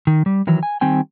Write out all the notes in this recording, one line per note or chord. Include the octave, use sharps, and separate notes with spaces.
D#3
G3
D#3 E3 F#3
G#5
D#3 G3 C4 G5 G#5